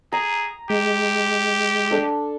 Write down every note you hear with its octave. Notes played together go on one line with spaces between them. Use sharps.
G#4 A#5
G#3 G4
D4 A4